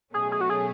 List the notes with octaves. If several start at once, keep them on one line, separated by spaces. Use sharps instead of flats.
B2 F#3 A3 C#4 G#4
G#4
F#4
G#4